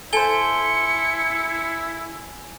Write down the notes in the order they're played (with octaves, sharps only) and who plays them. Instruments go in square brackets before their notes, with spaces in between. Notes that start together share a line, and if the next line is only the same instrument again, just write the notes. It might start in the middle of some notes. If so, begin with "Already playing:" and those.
[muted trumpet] E4 [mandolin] A4 C5 [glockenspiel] G#5 G7 [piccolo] C#7